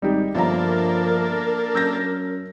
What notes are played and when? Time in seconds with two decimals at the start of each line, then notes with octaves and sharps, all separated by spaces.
0.02 G#1 G3 D#4 G4
0.35 G1 G2 F3 A#3 D4 A4 A#4 A#5
1.75 F#2 E6 G6 A#6